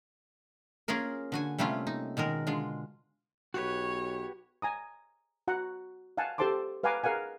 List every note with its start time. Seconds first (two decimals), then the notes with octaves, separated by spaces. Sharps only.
0.88 A#3 C#4 F4 G#4 A#4
1.32 D3 F#4 G#5
1.58 C3 G3 A3 A#3 C#4 F4
1.87 D#4
2.17 B2 D#3 G#3 A#4
2.47 D3 G#3 F4
3.54 B1 F#4 G4 B4 C#5
4.62 G#5 A#5 D#6
5.48 F#4 F#5 A#5
6.17 F5 F#5 G#5 A5
6.38 G4 A4 C5 A5 C6 D6
6.83 B4 F5 F#5 G#5 A#5 D6
7.04 G#4 A#4 F5 F#5 G#5